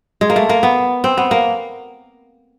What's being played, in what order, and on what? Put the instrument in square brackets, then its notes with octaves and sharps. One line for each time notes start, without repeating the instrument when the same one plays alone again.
[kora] G#3
A#3
A3
A#3
B3
C4
B3
A#3